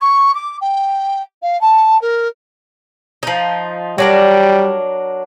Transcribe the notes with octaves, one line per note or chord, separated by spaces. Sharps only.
C#6
D6
G5
F5
A5
A#4
F3 D#4
F#3 G3 D4 A#4